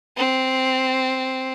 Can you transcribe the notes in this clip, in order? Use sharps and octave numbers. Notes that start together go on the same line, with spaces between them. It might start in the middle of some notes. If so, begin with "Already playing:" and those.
C4